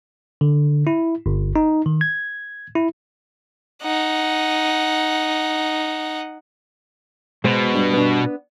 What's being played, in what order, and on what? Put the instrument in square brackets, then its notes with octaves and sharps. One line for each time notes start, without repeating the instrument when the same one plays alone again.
[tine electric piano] D3
E4
G1
D#4
D#3
G#6
E4
[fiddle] D#4 F#5
[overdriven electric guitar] B2 [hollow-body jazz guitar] G#3 C5
[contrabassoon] G2
[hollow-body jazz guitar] B3 D4